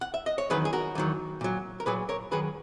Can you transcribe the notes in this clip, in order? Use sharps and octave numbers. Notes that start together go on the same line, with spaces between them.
F#5
E5
D#5
C#5
E2 D#3 F#3 G#4 B4
G#4
F#4 A#4
E2 D#3 F#3
A#2 F#3
A#4
A#2 F#3 G#4 B4
A#4 C#5
F#2 D#3 F#3 G#4 B4